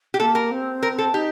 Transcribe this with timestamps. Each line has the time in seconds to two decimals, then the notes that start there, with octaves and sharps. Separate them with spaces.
0.14 G4
0.19 A#3 A4
0.35 A#4
0.51 C4
0.83 A#4
0.98 A4
1.14 D#4 G4